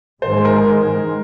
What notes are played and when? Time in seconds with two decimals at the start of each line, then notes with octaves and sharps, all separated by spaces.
0.22 G#2 D#3 G#3 C5
0.45 A#4